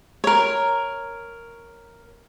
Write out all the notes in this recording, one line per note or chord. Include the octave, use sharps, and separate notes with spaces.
A#4 C#5